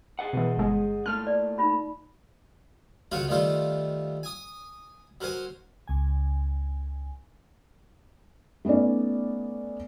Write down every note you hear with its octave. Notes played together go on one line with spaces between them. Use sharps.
G#4 D#5 F#5
B2 E3
G1 G#3
A#2 A3 A5 F6
D5
D#4 F4 B5
C#2 F#3 F4 F#4 A#4 C#5
D#3 G3 A3 F4 C5
G#5 D#6
F#3 A#4 C5 G#5
C#2 G#5
A3 B3 C#4 D#4 D5